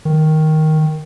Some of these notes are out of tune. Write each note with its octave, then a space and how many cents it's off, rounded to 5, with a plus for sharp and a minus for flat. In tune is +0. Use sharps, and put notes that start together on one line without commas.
D#3 +5